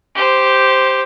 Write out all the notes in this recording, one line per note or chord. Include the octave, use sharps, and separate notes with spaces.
G4 C5